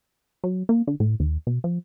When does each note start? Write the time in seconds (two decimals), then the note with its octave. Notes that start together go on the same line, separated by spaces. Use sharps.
0.44 F#3
0.69 A#3
0.87 D3
1.00 A2
1.20 D#2
1.47 B2
1.64 F3